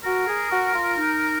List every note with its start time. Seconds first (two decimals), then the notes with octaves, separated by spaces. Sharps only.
0.04 F#4 A#4
0.27 G#4
0.51 F#4
0.73 F4
0.97 D#4